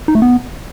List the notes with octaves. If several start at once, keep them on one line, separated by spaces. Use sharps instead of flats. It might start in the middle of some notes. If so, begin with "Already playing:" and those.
D#4
A3
B3